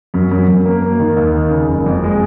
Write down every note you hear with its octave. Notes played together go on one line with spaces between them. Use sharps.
F#2
F#2
F#2
A#3
A#3
D#3
D#2
D#3
C#3
F#1
F2
G#3